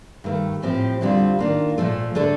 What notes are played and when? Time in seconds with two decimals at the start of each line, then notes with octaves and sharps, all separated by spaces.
0.24 G2 D#3 A3
0.62 A2 F3 C4 G4
1.01 F2 D3 G3 C4 F4
1.39 D#3 A#3 D4 F4
1.78 A#2 F3 A3
2.15 D3 A3 D4 A4